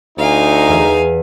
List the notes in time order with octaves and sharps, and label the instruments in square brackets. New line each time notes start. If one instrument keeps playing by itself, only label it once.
[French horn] D2 [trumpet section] D#4 [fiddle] F5 G#5
[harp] E2 G#4 E5